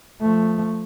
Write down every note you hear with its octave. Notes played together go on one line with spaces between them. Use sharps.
F3 A3